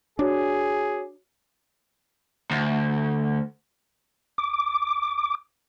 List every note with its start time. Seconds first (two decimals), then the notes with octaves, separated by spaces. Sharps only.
0.19 D4 F#4 G#4 C#5 D6
2.51 D2
4.38 D6